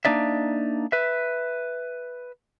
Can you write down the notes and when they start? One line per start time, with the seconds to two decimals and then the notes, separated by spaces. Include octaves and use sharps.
0.05 A#3 D4 D#4 D5 E5
0.92 B4 E5